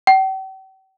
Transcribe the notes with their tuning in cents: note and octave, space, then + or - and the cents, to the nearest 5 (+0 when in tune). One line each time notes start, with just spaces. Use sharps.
G5 -45